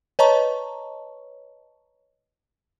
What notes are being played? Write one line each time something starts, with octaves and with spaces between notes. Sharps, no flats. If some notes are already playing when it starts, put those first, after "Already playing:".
B4 C#5 D#5 A5 A#5 C#6